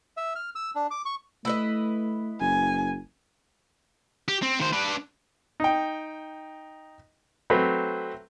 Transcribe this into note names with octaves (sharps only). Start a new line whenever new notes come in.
E5
F6
E6
D4
D6
C#6
A3 E4 B4 D#5
F#1 G#5
G4
C4
D#3 C5
D4 B4
D#4 G5
F#3 A3 C4 B4